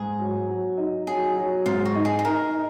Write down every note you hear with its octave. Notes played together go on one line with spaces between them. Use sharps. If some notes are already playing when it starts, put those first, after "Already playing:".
Already playing: G#2 G#4
F#3
F#3
D#4
F#3 G#4
F#3
G#2 F4
F#4
D#4
G#4
G#4
D#4 A#4
D#4